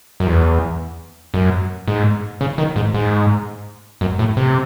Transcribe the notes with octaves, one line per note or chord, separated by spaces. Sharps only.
F#2
E2
F#2
G#2
C#3
D#3
G#2
G#2
F#2
A2
C3